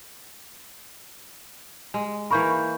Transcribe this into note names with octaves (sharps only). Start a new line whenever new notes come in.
G#3
E3 A#3 A#4 B5 C#6 G6